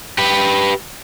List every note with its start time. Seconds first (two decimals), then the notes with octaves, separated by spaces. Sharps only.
0.18 G4 B4